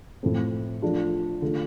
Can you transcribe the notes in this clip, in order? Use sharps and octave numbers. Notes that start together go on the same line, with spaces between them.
A2 F3 A3 C4
F3 A3 D4 F4
D3 A3 F4